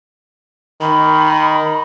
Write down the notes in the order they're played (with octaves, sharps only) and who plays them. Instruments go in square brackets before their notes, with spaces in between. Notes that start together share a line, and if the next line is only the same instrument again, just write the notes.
[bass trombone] D#3 [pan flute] B5